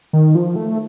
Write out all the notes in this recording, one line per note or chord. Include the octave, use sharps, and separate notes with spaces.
D#3
F3
A3